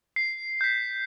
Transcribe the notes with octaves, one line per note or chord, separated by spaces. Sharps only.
C7
G6 B6